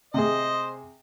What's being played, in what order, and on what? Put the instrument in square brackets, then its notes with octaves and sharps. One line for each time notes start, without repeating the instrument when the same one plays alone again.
[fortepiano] C3 G#4 [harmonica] C5 D#5